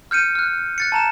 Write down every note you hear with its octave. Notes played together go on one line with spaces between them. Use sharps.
F6 G6 C#7 D#7
F6 F#6
F#6 A6 C#7
A5 A#5 E7